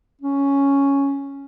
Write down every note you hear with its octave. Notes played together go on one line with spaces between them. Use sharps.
C#4